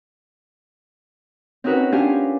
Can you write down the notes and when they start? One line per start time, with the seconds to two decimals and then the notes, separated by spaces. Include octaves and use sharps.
1.64 C4 C#4 D#4 F#4 A#4 B4
1.92 C#4 D4 F4 G4 F5 G#5